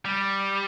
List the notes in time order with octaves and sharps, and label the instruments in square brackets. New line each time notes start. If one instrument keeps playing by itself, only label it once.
[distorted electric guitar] G3